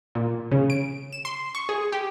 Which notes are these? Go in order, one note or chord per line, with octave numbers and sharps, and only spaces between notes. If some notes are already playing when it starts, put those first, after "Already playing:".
A#2
C#3
D7
E7
C6
C#6
G#4
G4